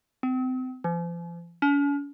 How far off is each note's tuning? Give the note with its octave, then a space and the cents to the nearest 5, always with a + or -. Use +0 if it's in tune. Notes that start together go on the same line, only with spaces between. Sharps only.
C4 -35
F3 -40
C#4 +45